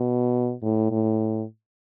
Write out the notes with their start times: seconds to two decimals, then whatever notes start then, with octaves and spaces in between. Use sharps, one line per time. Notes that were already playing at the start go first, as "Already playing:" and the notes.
Already playing: B2
0.62 A2
0.91 A2